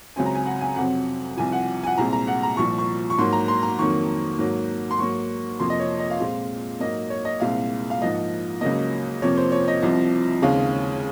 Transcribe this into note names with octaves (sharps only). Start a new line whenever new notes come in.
C#2 C#3 F#3 C4 G#5
A#5
G#5
F#5
G#5
F2 C3 F#3 C4 F#5
C2 C3 F3 G#5
F#5
G#5
F#5
C2 A#2 G#3 C4 A#5
A#5
F#5
A#5
C2 A#2 F3 C#6
C#6
C#6
G#2 F#3 A#3 C6
A#5
C6
A#5
F2 D#3 F#3 A#3 C#6
G#2 F#3 A#3
C6
G#2 F#3 A#3 C#6
F2 C3 F3 A#3 C6
D#5
C#5
D#5
F5
A#2 G#3 C4
G#2 F#3 A#3 D#5
C#5
D#5
C2 A#2 G#3 C4 F5
F5
G#2 F3 A#3 D#5
C#2 C#3 F#3 A#3 D#5
F2 C3 F3 A#3 C#5
C5
C#5
D#5
C2 C3 F3 C4
D#2 C#3 G#3 C4 F5